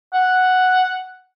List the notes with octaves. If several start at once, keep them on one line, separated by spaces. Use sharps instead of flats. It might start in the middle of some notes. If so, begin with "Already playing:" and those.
F#5